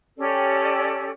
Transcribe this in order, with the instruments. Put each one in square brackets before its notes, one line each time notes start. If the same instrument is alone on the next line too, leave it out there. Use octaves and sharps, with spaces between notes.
[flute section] C#4 G4 A4 D5